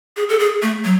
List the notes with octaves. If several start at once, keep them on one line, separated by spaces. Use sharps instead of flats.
G#4
A4
G#4
A3
F#3